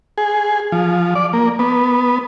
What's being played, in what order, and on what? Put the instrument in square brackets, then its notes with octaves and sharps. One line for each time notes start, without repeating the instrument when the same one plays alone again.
[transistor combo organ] G#4
F3
D5
A#3
B3